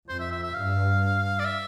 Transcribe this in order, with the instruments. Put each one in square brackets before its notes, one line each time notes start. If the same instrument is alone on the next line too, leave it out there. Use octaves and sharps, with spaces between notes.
[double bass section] F2 [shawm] C5
[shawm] E5
E5
E5
[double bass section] G2 [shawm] F5
[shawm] D5
E5